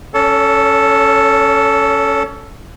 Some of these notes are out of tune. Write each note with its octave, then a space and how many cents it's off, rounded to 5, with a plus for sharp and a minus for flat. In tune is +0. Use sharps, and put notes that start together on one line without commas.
C#4 +0 A4 +0 C#5 +35